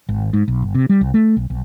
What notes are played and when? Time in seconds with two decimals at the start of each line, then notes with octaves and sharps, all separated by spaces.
0.09 G#1
0.33 G#2
0.48 B1
0.62 G1
0.75 C3
0.89 G3
1.01 C2
1.14 A3
1.37 B1
1.50 B1